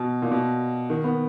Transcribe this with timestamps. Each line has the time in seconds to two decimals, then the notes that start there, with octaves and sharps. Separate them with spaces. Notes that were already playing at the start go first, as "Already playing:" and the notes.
Already playing: B2
0.22 A#2
0.31 B2
0.90 D#3
1.04 B3